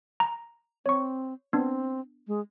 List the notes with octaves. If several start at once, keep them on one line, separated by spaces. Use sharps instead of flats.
A#5
C4 C#5 C#6
B3 C4 D4
G#3